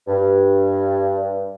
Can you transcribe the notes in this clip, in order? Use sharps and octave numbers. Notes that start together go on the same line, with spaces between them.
G2